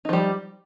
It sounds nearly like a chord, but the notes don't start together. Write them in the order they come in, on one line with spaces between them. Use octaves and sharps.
D#4 F3 G3